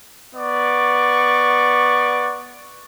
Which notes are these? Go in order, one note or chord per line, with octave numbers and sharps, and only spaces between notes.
B3 D5 C#6